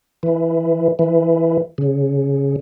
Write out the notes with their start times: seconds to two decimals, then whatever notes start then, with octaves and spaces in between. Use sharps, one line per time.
0.23 E3
0.99 E3
1.78 C#3